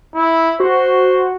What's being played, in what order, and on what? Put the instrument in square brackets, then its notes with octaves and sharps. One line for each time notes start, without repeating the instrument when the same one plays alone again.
[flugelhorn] E4
[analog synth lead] F#4 [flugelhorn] C5